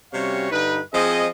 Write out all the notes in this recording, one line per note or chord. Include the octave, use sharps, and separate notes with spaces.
C3 G3 C#4 F#4 C#5 F5
G2 D3 D#4 B4
F3 C4 G#4 D#5